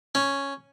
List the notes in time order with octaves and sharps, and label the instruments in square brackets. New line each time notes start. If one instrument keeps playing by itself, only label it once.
[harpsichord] C#4